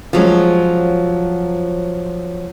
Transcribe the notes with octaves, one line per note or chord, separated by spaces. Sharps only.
F3 F#3 G#3 C#4